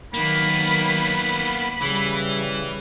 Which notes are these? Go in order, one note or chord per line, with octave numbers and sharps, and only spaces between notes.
D#3 F#3 A#3 B3 B5
C#3 E3 G3